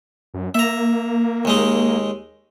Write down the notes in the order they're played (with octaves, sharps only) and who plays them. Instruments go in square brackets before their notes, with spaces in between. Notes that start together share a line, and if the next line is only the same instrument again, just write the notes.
[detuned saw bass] F#2
[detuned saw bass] A#3 [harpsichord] E5 A#5
[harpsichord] D#2 G#3 D#4